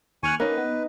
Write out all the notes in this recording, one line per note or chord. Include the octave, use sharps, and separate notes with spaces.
D#2 G#5 C#6 F6 F#6
A#3 C#4 D#4 B4
B3